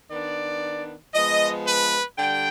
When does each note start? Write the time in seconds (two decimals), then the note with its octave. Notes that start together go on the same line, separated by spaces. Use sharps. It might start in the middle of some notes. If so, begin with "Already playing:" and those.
0.11 D#3 B3 D4 D5
1.15 F3 G#3 B3 D#5
1.67 B4
2.18 D3 G3 G5